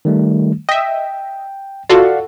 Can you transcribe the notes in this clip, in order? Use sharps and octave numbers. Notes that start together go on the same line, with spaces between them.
D#3 G3 A3
D#5 E5 G5
F4 F#4 A4 D5 F5 F#5